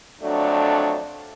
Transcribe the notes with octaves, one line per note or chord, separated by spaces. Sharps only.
F2 F#3 A3 D4 D5